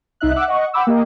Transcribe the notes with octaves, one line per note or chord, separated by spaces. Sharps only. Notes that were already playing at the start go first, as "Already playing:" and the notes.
C2 D#4 E5 F#6
E5 F#5 D6 E6 F#6
D#5 F#5 C#6
F#5 G5 B5 D6 E6
A#3 G4 D#5